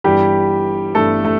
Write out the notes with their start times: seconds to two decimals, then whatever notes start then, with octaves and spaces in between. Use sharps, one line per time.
0.04 G1 G2 E3 G3 G4
0.95 G1 G2 E3 G3 A3 A4
1.24 A3